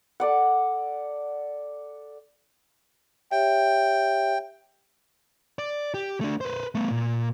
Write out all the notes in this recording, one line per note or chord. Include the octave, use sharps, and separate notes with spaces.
A4 D5 F#5
G4 C#5 E5 G5
D5
G4
A3 D4
B4 C5
A3 B3
A#2